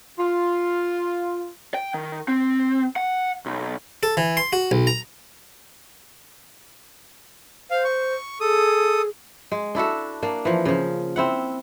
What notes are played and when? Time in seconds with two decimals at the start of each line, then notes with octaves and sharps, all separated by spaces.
0.18 F4
1.74 G5
1.94 D#3
2.28 C4
2.96 F#5
3.46 B1
4.03 A4
4.17 E3
4.37 C6
4.53 F#4
4.71 B1
4.87 A#5
7.71 C5 F5
7.84 C#6
8.41 G#4 A4 D#6
9.52 G#3
9.75 D4 E4 F#4 A4
10.23 A#3 D4
10.45 E3 F3
10.65 C#3 F3
11.16 C4 E4 F#5